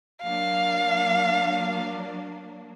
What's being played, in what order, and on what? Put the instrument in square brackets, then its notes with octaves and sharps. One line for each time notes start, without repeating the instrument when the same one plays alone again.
[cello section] F#3 A#3 D4 [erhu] F5